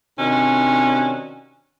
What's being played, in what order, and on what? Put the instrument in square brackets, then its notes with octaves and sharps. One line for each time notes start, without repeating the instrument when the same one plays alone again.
[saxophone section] C3 D#3 C#4 D4 F#4